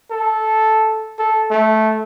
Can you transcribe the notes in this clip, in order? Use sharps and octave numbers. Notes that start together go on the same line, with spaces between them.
A4
A4
A3